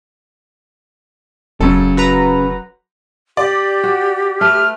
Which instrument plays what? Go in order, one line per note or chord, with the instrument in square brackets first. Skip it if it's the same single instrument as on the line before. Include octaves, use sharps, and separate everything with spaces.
[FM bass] E1 [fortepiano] F#2 A4 [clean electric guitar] C#3
[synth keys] F#4 B4 A#5
[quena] G4 [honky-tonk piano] D5
[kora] F#4
[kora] A3 B4 [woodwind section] F6